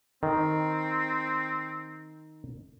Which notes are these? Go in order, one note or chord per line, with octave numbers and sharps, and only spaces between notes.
D#3 C4